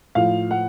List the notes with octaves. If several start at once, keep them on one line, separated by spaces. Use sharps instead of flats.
A2 F3 F5
F#5